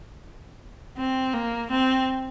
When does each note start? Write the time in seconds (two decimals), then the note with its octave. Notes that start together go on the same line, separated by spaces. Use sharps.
0.98 C4
1.34 A#3
1.70 C4